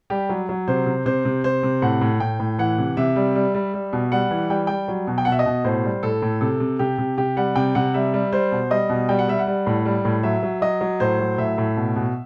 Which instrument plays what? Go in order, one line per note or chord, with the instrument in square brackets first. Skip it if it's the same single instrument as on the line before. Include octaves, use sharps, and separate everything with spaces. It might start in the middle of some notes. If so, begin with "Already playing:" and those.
[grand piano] G3 G4
F#3
F#3
C3 C5
C3
C3 C5
C3
C3 C5
C3
A2 F#5
A2
A2 G5
A2
E3 F#5
C3
C3 E5
G3
G3
G3
G3
B2
G3 F#5
E3
G3 G5
G3 G5
F#3
B2
G5
B2 F#5
E5
D#5
B2
A2 C5
G3
A2 A4
A2
C3 A4
C3
C3 G4
C3
C3 G4
G3 F#5
C3 G5
C3 F#5
G3 E5
G3
G3 C5
B2
G3 D#5
B2
G3 G5
F#5
G3 E5
F#5
G3
A2
G3
A2
F#3 E5
F#3
F#3 D#5
F#3
A2 C5
F#3
A2 E5
A2
B2
B2